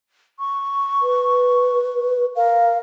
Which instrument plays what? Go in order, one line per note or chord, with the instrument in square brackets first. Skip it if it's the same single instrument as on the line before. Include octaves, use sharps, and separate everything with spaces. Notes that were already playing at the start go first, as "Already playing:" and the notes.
[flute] C#6
[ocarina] B4
[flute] A#4 [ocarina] F5